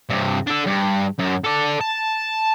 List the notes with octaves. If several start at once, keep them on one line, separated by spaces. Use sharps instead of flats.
G2 C3
D4 A4
G2
F#2
A4 D5
A5